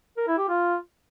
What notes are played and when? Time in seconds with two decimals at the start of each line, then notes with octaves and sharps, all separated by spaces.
0.17 A#4
0.27 E4
0.38 G4
0.48 F4